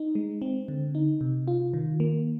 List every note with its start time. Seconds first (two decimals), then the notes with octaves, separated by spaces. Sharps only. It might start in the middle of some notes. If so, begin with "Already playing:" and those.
Already playing: D#4
0.15 G#3
0.42 C4
0.68 D3
0.95 D#4
1.21 C3
1.48 F4
1.74 D#3
2.00 A#3